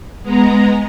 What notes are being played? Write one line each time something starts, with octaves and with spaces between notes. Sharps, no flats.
G#3 B3 A#5